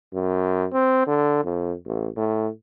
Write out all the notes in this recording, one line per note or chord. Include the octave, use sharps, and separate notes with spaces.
F#2
C4
D3
F2
A1
A2